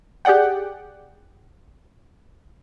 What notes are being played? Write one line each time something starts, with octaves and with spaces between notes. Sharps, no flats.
G4 G#4 D5 F#5 G5